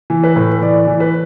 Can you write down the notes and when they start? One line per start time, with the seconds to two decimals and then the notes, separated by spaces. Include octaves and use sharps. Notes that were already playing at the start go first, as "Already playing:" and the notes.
0.10 E3
0.24 B4
0.36 A2
0.62 E3 D5
0.87 E3
1.00 B4